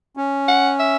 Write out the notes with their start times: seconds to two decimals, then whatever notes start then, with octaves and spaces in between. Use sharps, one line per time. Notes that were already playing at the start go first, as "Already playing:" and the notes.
0.17 C#4
0.48 F#5
0.80 E5